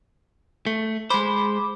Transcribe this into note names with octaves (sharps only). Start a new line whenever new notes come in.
A3
G#3 C5 B5 D6